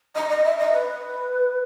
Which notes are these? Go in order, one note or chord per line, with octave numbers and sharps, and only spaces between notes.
D#5
D#5
E5
D#5
B4